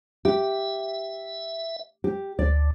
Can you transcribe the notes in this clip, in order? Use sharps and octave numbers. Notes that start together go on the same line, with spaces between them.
G4 E5
G4
D2 D5